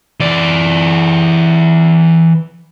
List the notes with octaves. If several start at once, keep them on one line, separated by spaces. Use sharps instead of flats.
E3 D5